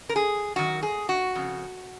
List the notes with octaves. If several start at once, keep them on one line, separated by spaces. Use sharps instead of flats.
A#4
G#4
F#2 D#3 F#4
G#4
F#4
F2 C#3